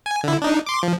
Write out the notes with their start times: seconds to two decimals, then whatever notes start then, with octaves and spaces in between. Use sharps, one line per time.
0.06 G#5
0.24 D3 E4
0.42 D4 D#4
0.67 C6 D6
0.83 F3